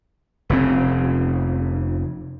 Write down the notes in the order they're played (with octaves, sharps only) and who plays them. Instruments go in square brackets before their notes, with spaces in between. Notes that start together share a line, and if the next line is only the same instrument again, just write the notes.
[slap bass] F1 C#3 C4